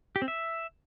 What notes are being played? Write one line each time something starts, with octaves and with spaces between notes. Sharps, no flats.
G4
C4
E5